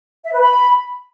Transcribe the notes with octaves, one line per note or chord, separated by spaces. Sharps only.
E5
B4
B5